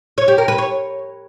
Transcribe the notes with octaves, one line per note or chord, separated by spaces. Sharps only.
C#5
G4
A#4
B4
C#5